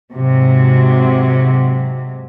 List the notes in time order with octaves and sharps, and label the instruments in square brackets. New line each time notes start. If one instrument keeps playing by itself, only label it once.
[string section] G#2 C3 F#3